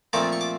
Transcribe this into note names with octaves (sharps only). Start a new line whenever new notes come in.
A#2 F3 A3 C4 D#4 D6
C#6
D6